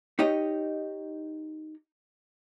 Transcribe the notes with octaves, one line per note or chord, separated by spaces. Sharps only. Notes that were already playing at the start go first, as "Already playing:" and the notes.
D#4 G4 C#5 D#5